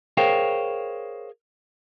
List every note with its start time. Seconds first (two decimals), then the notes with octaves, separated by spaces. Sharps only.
0.17 G#4 A#4 C5 C#5 F5 G5